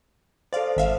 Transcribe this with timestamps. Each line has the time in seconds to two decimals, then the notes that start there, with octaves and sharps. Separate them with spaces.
0.53 A4 C5 D5 F5
0.77 G#1 E5 F5